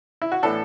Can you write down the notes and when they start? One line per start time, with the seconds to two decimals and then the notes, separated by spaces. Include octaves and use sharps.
0.22 E4
0.32 F#4
0.42 A2 E3 B3 D4 A4